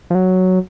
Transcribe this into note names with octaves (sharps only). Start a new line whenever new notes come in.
F3
F#3